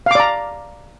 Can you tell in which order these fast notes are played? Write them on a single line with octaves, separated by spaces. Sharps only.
F5 D6 D5 A#5